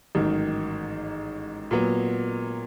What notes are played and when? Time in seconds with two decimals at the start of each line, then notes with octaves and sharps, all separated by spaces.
0.15 A1 G#2 D#3 F#3
1.71 A#2 F#3 B3